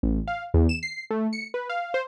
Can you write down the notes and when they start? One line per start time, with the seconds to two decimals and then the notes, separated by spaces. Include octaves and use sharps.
0.03 A1
0.28 F5
0.54 E2
0.69 E7
0.83 C7
1.10 A3
1.33 C#7
1.54 B4
1.69 F5
1.94 C5